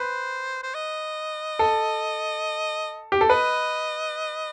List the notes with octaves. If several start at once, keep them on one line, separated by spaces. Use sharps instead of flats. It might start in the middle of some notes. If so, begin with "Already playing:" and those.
Already playing: B4 C5
C5
D#5
A4
G4
A4
B4 D#5